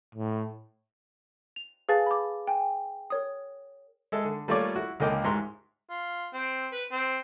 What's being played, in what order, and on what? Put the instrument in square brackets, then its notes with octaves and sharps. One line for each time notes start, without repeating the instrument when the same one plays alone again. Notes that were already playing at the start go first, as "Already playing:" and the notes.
[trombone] A2
[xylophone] F7
G#4 B4 F5 G#5 A5 A6
B5 D6
G5 G#5
A#4 C#5 D#6
[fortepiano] G#3 A4 E5
D3
G3 A3 A#3 F4 C#5 D5
E4 F#4
C#2 D3 A#3 D#5 G5 D6
A1 G#2 A#5 C6
[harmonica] F4
C4
B4
C4